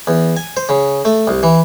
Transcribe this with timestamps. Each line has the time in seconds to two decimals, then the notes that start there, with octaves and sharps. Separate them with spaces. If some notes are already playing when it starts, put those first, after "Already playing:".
0.07 E2
0.37 G#5
0.57 C5
0.69 C#3
1.05 A3
1.27 C2
1.43 E3